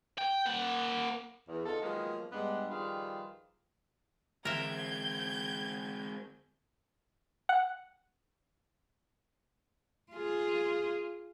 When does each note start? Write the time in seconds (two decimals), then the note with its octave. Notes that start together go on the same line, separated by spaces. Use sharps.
0.18 G5
0.46 A#3 F#5
1.48 E2
1.66 D3 D#4 F4 A4
1.82 D#3 F3 F#3 G#3 A#3 B3
2.32 G2 G3 G#3 B3 D4 F#5
2.69 D#3 F3 G3 F4 G#4 B4
4.45 D3 E3 G#3 C4 A#4 E5 G6 G#6
7.49 F#5
10.12 F4 G#4